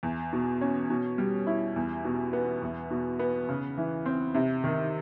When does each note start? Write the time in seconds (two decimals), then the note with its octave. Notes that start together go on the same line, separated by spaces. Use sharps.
0.03 E2
0.33 B2
0.61 C#4
0.90 B2
1.18 G3
1.47 E4
1.76 E2
2.05 B2
2.33 B3
2.62 E2
2.90 B2
3.19 B3
3.49 C#3
3.77 E3
4.05 C4
4.34 C3
4.64 D#3